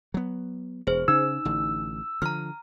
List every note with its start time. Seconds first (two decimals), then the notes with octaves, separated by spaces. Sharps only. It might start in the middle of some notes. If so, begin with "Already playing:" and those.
0.14 F#3 B3
0.87 E1 G#4 C5
1.08 C#3 D#4 E6
1.45 A1 D3
2.22 D3 F3 A#5 F6